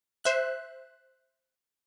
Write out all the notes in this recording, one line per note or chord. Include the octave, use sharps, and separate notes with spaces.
C5 E5 F#6